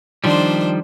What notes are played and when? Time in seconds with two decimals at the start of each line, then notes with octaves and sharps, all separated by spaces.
0.24 D#3 F3 G3 D4 C5